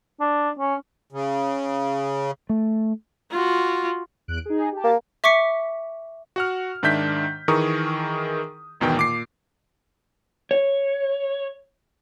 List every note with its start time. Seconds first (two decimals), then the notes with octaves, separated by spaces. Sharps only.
0.20 D4
0.59 C#4
1.12 C#3
2.49 A3
3.32 F4 F#4
4.28 E2 F#6 D7
4.46 D#4 G#4
4.72 G4 A5
4.84 A#3
5.24 E5 C#6 D6 B6 C#7
6.36 F#4 F#5 F6
6.83 G#2 D#3 D4 E5 G6 B6
7.48 D#3 E3 G#4 A#4 C#6 D#6
8.81 G#1 E2 B2 D#3 E3 G5
8.97 A#2 D6 C7
10.51 C#5